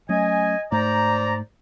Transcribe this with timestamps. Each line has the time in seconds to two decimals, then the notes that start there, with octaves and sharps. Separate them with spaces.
0.09 F#3 A3 C#4 D#5 G#5
0.72 G#2 A3 C5 D5 A#5